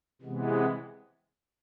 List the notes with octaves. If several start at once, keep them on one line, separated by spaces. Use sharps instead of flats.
C3 E3 G#3 B3